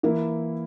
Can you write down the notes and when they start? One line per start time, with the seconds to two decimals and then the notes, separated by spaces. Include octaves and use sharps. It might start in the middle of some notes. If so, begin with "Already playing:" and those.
0.03 E3 A#3 E4